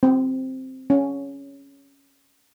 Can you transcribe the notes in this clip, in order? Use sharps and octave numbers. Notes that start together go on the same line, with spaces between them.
C4
C#4